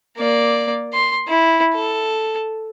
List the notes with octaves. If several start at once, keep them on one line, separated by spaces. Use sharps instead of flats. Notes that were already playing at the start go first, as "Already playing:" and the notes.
A#3 D5
C6
E4
A4